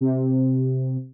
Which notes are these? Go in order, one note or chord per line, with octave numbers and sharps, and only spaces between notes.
C3